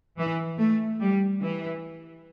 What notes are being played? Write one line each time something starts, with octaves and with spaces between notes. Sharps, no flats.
E3
A3
G3
E3